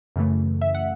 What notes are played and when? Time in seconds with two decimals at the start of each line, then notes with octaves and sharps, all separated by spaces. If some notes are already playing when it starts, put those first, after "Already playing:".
0.16 F#2 C#3 E3 A3
0.61 E5
0.75 F#5